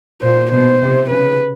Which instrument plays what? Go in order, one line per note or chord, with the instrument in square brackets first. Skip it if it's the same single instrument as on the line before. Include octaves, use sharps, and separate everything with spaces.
[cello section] A#2 [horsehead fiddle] C5
[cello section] B2 [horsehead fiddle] C5
[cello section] C3
[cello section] C#3 [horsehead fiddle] B4